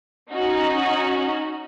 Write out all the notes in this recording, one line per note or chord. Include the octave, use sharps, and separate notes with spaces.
C#4 D#4 F#4